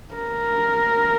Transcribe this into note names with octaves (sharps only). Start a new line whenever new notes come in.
A#4